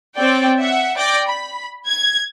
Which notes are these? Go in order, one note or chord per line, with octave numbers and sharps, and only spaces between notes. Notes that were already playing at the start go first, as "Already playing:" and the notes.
C4 C#5 D5 G5
E5 F#5
D5 G5 D6 G6 A#6
B5
G#6